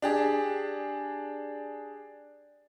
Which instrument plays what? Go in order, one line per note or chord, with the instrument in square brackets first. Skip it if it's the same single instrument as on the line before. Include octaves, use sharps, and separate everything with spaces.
[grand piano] D4 G4 G#4